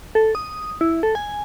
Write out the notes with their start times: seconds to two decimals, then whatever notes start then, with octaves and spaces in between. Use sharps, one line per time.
0.15 A4
0.35 D#6
0.81 E4
1.03 A4
1.15 G#5